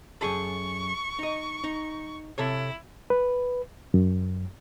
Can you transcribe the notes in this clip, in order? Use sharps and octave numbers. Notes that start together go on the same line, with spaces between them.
F#2 G#4 A4 C#6
D#4 D#5
D#4
C3 E4 A4 C#5
B4
F#2